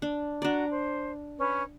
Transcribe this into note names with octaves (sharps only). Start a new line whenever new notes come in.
D4
D4 F#4 D5 A#5
C5
C#4 B4